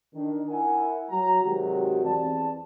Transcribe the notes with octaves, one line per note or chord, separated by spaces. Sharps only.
D#3 D4
E4 A#4 E5 F#5 G#5
F#3 A#5
C3 D#3 F#3 G#3 F#4 G4
E2 C4 D5 A5